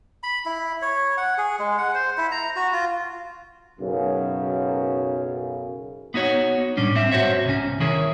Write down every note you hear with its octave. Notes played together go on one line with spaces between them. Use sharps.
B5
E4
C#5
F#5
G#4
G#3
F#5
C5
E4
A#5
F#4
F4
B1 F#2 C#3
B3 D#4 F#4 C#5
A2 G3 C#4 D4
C4 E5
G#2 F#4 C5 C#5 E5
C2 C#4
D#3 E4 G#4 A#4 C#5